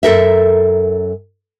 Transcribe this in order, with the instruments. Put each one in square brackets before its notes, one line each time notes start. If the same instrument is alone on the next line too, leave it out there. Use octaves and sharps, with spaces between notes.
[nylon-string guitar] F#2 A4 A#4 E5